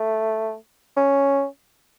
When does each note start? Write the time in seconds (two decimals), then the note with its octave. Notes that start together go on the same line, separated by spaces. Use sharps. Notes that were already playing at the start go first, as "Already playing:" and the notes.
Already playing: A3
0.97 C#4